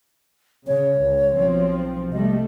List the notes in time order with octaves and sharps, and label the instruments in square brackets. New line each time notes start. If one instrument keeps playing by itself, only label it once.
[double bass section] C#3 [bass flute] C#5
[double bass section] C#2
B1 F3 C4
[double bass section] C3 G3 A3 [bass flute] D#5